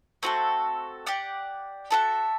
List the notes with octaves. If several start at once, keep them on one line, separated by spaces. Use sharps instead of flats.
A3 C4 F#4 A4
G4 D5 F#5
F#4 A4 E5 A5